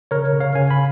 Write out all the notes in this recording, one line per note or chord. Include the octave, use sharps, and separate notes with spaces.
C#3 A#4 C#5
C#3
C#5 F5
C#3 F5 G#5
G#5 B5